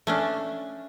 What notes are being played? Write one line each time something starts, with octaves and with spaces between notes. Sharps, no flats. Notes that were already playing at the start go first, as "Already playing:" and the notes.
A3 C#4 D4